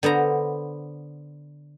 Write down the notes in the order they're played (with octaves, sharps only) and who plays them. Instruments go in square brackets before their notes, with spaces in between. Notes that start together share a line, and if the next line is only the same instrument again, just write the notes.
[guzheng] D3 B3 C5 A#5